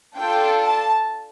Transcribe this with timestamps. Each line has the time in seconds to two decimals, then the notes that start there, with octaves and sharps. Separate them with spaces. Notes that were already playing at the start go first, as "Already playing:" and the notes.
0.16 D4 F4 A4 G5
0.61 A5